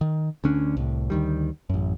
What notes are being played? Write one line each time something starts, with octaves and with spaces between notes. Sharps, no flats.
D#3
D2 D3 C#4 D4
C2 A2
D2 D#3 G3
A1 F#2